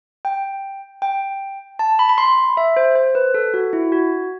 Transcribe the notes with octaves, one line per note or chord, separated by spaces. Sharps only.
G5
G5
A5
B5
B5
C6
E5
C5
C5
B4
A4
F#4
E4
F#4